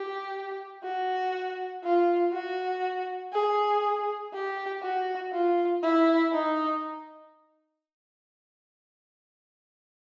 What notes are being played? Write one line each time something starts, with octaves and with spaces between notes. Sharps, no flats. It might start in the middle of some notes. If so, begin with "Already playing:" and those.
Already playing: G4
F#4
F4
F#4
G#4
G4
F#4
F4
E4
D#4